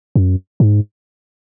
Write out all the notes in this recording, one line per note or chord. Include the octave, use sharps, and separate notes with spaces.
F#2
G#2